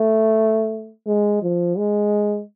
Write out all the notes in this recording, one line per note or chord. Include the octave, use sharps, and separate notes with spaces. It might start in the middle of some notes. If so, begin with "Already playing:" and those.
Already playing: A3
G#3
F3
G#3